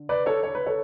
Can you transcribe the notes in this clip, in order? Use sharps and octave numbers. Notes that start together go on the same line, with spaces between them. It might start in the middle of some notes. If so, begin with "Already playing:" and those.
Already playing: D3
B4 D5
A4 C#5
C#5
B4
A4 C#5